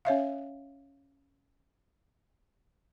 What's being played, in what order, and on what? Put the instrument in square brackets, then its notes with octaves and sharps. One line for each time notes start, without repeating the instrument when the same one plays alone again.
[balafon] C#4 C#5 E5 F5